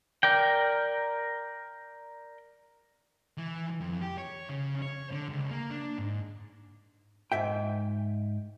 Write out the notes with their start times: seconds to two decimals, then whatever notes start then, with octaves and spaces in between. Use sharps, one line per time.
0.23 A#4 D5 G5
3.37 E3
3.80 F2
4.02 G4
4.18 C#5
4.49 C#3
4.82 C#5
5.12 D3
5.29 C#2
5.51 A#3
5.71 D4
5.98 G#2
7.32 G#2 E5 G5